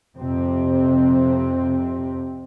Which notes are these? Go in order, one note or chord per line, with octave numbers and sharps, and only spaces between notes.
F2 C3 C4